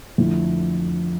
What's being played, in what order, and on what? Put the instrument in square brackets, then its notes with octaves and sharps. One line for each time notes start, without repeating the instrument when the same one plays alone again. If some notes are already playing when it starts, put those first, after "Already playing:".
[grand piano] F2 D3 A3 E4